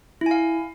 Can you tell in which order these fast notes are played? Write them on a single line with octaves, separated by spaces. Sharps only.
E4 G#5 F5